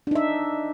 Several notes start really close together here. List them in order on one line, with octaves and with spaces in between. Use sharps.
D4 D#4 E5